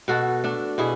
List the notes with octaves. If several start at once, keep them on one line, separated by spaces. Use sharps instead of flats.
B2 F#4 A4
A3 D4
B2 E4 G#4